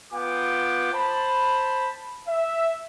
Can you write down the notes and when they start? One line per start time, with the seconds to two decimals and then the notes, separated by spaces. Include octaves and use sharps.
0.13 B3 F4 G5 D6
0.93 C5 A5 B5
2.27 E5